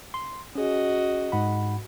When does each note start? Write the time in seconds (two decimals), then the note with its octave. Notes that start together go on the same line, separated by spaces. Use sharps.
0.14 C6
0.55 C#4 F#4 G#4 D#5
1.32 G#2 F#5 B5